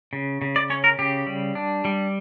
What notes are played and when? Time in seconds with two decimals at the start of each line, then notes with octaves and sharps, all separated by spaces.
0.13 C#3
0.42 C#3
0.56 D5
0.70 C#4 C#5
0.84 A#4
0.99 C#3 G4
1.27 G3
1.55 D4
1.85 G3